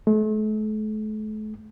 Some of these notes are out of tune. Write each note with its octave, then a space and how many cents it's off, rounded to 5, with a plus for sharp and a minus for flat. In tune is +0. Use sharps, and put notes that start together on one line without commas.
A3 -40